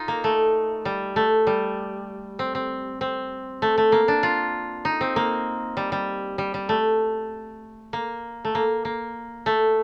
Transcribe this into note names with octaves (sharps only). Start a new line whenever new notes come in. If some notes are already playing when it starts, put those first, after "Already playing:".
Already playing: D#4 F4
A#3
A3
G3
A3
G3
C4
C4
C4
A3
A3
A#3
D4
F4
D#4
C4
A#3
G3
G3
G3
G3
A3
A#3
A3
A#3
A#3
A3